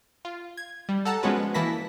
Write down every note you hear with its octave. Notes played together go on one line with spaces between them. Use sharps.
F4
G#6
G3
A4 F#5 A5 A#5
F3 G#3 B3 C#4 F#4 B4
E3 A#3 E4 A5 A#6 B6